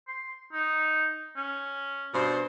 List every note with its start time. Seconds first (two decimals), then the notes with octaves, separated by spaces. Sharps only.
0.08 C6
0.53 D#4
1.37 C#4
2.13 G2 B2 C5